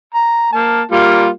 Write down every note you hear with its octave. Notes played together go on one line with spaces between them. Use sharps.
A#5
A#3 A5
G3 A#3 F4